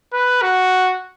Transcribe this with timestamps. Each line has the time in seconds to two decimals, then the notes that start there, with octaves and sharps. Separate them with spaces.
0.13 B4
0.42 F#4